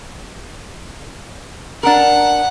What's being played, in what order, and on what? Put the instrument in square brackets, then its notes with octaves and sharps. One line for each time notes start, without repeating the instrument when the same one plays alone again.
[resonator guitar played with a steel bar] D4 A#4 [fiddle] F#5